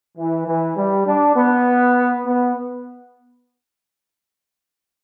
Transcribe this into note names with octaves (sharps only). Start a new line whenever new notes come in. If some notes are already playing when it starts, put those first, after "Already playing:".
E3
E3
G3
D4
B3
B3